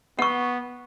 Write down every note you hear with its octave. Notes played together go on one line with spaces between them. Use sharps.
B3 F#5 C#6